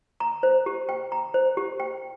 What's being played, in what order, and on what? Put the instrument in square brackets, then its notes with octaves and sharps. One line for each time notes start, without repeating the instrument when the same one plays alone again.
[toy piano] A#5
C5
G4
G5
A#5
C5
G4
G5